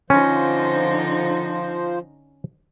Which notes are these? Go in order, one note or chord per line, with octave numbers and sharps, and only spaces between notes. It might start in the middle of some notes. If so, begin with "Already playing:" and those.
D3 F3 C#4 D#4 C5